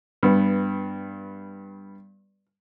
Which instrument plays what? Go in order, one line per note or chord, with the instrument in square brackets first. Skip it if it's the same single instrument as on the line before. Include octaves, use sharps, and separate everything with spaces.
[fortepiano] G2 B3